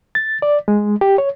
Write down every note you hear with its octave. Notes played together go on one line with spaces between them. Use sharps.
A6
D5
G#3
G4
C#5